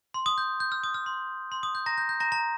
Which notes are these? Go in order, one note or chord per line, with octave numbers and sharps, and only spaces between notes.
C6
D#6
G6
G6
F6
D#6
F6
C6
C6
D#6
G6
A#5 A#6
G6
G6
A#5 A#6
A#5 A#6